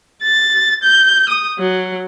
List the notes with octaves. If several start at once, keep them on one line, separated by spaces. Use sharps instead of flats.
A6
G6
D#6
F#3